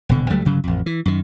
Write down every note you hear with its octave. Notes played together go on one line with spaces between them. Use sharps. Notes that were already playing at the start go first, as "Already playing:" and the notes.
D#1 B2 D3
C#2 F#3 G3 A3
G1 C#3 F#3
A1 F2
E3
F#2 D#3